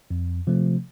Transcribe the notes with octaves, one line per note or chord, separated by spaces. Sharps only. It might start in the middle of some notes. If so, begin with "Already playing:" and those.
F2
C3 F3 A3